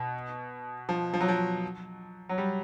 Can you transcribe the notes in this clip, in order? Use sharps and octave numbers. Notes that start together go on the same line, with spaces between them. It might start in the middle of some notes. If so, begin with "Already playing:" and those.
Already playing: B2
F3
F3
F#3
F3
F#3
G3